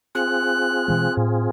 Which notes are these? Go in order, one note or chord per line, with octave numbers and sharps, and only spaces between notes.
C4 F4 G#4 F#6
B2 E3 G#3
A2